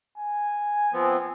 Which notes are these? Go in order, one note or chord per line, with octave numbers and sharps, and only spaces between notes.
G#5
F3 B3 C4